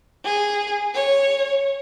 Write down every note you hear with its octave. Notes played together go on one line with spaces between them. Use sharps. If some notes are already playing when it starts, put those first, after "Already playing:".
G#4
C#5